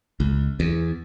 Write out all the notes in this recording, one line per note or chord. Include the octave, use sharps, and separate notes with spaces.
C#2
E2